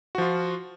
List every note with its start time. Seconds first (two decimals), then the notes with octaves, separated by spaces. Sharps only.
0.15 F#4
0.18 F3
0.22 F4